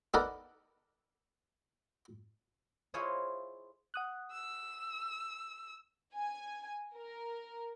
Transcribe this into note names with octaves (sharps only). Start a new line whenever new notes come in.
B3 D#4 A4 A#4 D5 F#5
E4 F4 G#4 C5 C#5 D#5
F#5 D#6 F#6
E6
G#5
A#4